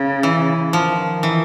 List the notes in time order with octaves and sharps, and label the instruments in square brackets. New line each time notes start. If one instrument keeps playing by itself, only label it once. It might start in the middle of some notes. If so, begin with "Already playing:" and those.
Already playing: [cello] C#3
[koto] E3
[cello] D#3 [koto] F3
[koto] E3